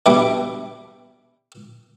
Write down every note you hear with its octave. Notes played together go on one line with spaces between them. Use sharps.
B2 G3 D4 E4 B5 D6